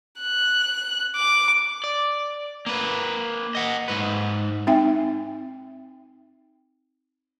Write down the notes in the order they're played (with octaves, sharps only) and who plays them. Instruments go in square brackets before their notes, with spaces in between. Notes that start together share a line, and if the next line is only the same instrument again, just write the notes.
[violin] F#6
D6
[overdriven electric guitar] D5
A#3 B4
D#5 F#5
G#2 B4
[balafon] C4 D#4 E5 G5